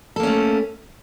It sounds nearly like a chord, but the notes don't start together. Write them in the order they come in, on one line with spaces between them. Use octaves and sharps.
A4 A#3 C#4 A3